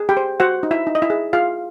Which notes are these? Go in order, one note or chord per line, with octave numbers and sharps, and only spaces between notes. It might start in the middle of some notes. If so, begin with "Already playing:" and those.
Already playing: G#4
G4 G5
C5
F#4 C5 F#5
D#4
E4 E5
D#4
D#5
E4 E5
G#4
F4 G#4 F5